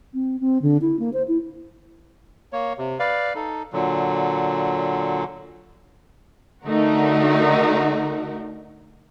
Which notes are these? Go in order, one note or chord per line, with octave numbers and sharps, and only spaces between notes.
C4
C4
D3
E4
A#3
C5
E4
A#3 C#5
C3
B4 D5 F5
D#4 A4
A#2 D3 F#3
D3 A3 D#4 F#4 A#4